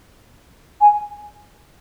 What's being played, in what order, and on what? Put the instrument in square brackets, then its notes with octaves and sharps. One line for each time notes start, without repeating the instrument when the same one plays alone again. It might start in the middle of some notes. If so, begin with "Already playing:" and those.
[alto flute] G#5